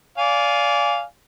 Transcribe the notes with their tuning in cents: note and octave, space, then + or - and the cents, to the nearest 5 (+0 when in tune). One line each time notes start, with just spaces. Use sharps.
D5 -25 F5 +0 G#5 +0